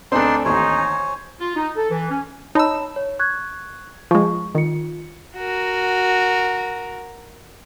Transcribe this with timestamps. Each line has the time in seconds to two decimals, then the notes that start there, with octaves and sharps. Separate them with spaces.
0.12 D2 B3 C4 D4 D#4 G#4 C5 C6
0.45 A1 D#2 D#4 C5 C#5 G#5
1.40 F4
1.56 D#4
1.76 A4
1.90 E3
2.10 C#4
2.55 D#4 C#5 A5 B5 E6
2.96 C#5
3.19 C#6 F#6 G#6
4.11 F3 G#3 C#6
4.55 D#3 F4 C#7
5.37 F#4 A#4